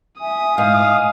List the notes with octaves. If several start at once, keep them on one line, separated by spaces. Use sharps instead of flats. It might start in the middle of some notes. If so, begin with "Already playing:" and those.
E5 G#5 D#6
G#2 F5 G#5